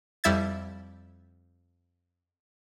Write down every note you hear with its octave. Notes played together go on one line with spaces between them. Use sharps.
F2 G3 E4 E5 G#6 A6